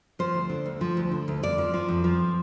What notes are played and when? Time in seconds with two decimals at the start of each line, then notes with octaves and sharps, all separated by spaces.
0.19 F3 C5
0.34 D2
0.50 D3
0.66 D2
0.81 F3
0.97 D2
1.11 D3
1.28 D2
1.43 F2 D5
1.58 F3
1.74 F3
1.89 F2
2.04 F3